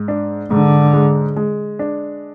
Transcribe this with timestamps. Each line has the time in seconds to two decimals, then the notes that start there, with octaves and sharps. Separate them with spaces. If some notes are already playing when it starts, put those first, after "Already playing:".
Already playing: G#2
0.08 D4
0.51 G#2 D3
0.93 G#3
1.36 G#3
1.79 D4